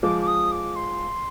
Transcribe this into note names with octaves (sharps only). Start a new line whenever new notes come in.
F3 G#3 D6
D6
D#6
D6
C6